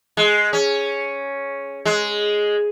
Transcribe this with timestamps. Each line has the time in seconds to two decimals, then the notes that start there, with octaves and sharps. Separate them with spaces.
0.17 G#3
0.53 C#4
1.85 G#3